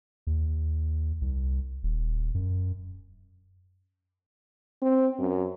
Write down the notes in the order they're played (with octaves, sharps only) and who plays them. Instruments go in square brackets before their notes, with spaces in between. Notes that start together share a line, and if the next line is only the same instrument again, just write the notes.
[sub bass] D#2
C2
D#1
F#2
[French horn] C4
F#2